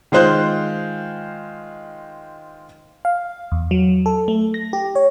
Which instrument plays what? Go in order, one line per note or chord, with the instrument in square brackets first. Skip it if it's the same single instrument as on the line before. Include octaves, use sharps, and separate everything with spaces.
[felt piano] D#3 G#3 F4 C5 F#6 G6
[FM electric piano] F5
E2
F#3
A4
A3
A#6
G4
C#5